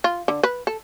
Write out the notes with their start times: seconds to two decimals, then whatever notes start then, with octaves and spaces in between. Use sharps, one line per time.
0.04 F4
0.28 D3
0.43 B4
0.67 A4